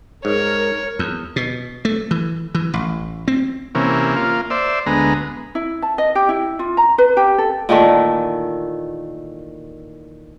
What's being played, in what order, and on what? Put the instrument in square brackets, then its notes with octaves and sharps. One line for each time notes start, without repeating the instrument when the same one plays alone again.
[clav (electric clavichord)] G#2 [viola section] A#4 [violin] C#5
[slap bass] E2
B2
A3
E3
E3
A1
C4
[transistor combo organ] C3 E3 A#3 C#4
A#3 F4
C5 D5 E5
D2 G#3 B3 A#5
[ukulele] E4
A5
D#5
G4
E4
F4
A#5
B4
G4
A4
[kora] A#2 D#3 E3 A3